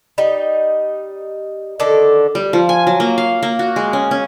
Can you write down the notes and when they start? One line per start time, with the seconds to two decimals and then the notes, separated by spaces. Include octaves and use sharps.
0.18 G3 D#4
1.80 D3 D#3 D4 A4
2.35 G3
2.53 F3
2.69 G#5
2.87 F#3
3.00 A#3
3.18 F5
3.43 A#3
3.59 F#4
3.76 G#3
3.93 C#4
4.11 C#4